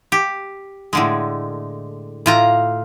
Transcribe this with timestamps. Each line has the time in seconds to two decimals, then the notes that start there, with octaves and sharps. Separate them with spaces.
0.12 G4
0.93 A2 D3 G#3
2.26 A2 F4 A#5